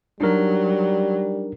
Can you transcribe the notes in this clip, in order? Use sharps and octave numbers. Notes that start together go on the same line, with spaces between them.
F#3 G3 D4 D#4 A#4